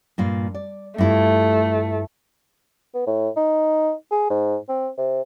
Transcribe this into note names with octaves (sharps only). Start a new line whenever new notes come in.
G2 A#2 F4
D5
G2 A3 E4 F4
B3
A2
D#4
G#4
G#2
C4
C3